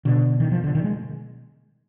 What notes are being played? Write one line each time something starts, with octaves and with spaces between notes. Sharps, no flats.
B2 D3
D#3
F3
D3
D#3
G#3